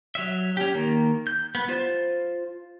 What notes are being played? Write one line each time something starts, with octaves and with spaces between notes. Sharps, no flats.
F#3 E5
C#4 G4
D#3 A#3
G6
B3
F4 C5